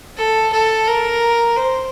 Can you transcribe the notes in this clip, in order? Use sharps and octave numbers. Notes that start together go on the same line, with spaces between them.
A4
A4
A#4
C5